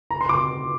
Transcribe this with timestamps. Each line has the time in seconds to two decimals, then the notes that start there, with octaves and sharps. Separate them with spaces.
0.11 A#5
0.21 C6
0.29 D6